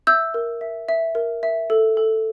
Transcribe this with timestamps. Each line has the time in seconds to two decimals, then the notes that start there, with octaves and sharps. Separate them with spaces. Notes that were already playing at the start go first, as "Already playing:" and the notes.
0.07 E5 E6 G6
0.34 A#4
0.61 E5
0.89 E5
1.15 A#4
1.43 E5
1.70 A4
1.97 A4